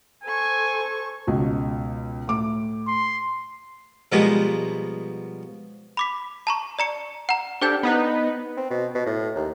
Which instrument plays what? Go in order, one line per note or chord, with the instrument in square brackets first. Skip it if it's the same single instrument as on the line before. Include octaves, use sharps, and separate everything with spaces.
[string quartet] A4 C5 C#6 [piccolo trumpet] G#5
[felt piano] C#2 B2
A2 D6
[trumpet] C6
[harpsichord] B2 F3 G3 G#3 A#3 B3
[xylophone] B5 D6 B6
A5 A#5 C#6
D5 A#5 C#7
F#5 A#5
[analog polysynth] D4 G4 A4 [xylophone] C5 G5 G6
[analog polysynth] B3 D#4 B4
[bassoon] C4
B2
B2
A2
D#2